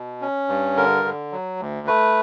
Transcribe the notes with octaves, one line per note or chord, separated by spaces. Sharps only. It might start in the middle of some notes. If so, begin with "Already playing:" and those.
Already playing: B2
C#4
G2
D3 A#4
D3
F#3
D2
A3 B4